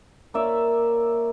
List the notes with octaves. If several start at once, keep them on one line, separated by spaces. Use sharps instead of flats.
A#3 C#5 D5 E5